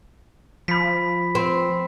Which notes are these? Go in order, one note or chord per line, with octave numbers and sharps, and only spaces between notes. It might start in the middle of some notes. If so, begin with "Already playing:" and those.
F3 B5 B6
C4